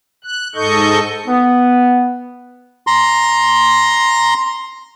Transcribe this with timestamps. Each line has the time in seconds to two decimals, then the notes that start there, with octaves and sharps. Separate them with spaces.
0.24 F#6
0.55 G#2 A4 D#5 C#6 G6
1.27 B3
2.87 A#5 C6